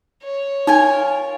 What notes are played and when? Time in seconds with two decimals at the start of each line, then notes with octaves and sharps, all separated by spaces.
0.24 C#5
0.67 D#4 F4 A#4 G#5